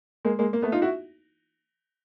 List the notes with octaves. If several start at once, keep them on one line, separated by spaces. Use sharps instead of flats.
G#3 A#3
G#3 A#3
A#3
A3 B3
D#4 F4
E4 F#4